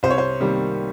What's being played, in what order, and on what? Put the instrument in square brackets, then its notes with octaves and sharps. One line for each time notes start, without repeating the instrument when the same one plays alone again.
[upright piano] C2 C5
C#5
C5
C3 D#3 G3 A#3